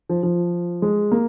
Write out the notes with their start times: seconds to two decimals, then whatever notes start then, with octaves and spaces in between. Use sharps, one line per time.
0.09 F3
0.23 F3
0.82 G#3
1.12 A#3